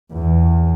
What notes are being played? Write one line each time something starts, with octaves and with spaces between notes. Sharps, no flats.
E2